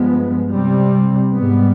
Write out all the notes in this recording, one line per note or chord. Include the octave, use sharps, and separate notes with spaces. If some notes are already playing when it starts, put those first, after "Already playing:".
Already playing: G2 F3 G#3 B3
C3 G3 C4
G#2 G3 B3